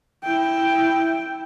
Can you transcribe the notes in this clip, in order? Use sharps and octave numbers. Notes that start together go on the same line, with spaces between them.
E4 G5